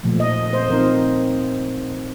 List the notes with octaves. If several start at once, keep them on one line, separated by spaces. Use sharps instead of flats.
A#2 F3 A3
D#5
C5
F3 C4 D#4 A#4